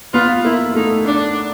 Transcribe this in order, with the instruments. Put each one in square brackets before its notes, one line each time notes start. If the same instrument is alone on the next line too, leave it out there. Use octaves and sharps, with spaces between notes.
[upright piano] B3 [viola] F4
[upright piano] A#3 [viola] E4
[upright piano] A3 [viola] D#4
[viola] D4